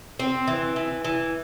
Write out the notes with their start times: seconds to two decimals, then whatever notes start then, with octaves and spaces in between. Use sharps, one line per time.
0.19 C4
0.48 E3
0.76 E3
1.05 E3